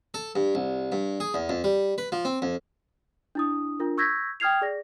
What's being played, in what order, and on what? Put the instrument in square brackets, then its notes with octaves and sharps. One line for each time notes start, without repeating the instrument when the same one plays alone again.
[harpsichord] A4
G2
C2
G2
G#4
E2
F2
G3
B4
F3
C4
F2
[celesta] D4 E4 D#6
D4 F4 A#4
C#6 E6 G6 G#6 A#6 B6
G5 D#6 F6 G#6 C7 F7
G#4 D5 A#6